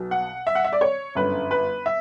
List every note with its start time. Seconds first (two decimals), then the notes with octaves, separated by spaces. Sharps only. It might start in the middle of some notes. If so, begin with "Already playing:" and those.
Already playing: B1 B2 F#3
0.11 F#5
0.47 E5
0.55 F#5
0.64 E5
0.72 D5
0.81 C#5
1.15 G1 F#2 D3 B4
1.51 B4
1.86 E5